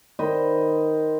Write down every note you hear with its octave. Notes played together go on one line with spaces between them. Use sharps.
D#3 C5 D#5 B5